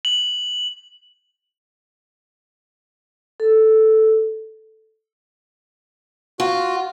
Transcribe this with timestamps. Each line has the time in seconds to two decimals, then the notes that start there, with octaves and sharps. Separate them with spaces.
0.05 F#7
3.40 A4
6.40 F4 F#4